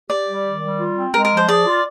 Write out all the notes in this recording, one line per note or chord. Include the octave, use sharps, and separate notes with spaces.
G4 D5
G3
D#3
G3
F4
C4
G#3 A#4
A#4
F3
C5
G#4 D5
F4